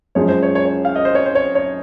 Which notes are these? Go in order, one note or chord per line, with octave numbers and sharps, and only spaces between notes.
F#2 F3 G#3 C#5
C5
C#5
C#5
C#5
F5
D#5
C5
C#5
C5
C#5
C#5